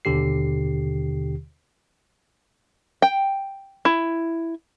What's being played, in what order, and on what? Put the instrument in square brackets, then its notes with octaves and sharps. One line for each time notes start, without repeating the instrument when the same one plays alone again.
[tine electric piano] D#2 B2 D3 G4 C7
[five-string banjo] G5
E4